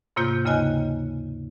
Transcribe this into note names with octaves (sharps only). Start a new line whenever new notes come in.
G#2 C3 A#3 F4 G6
D#2 C#3 A#3 D#5 G#5 F#6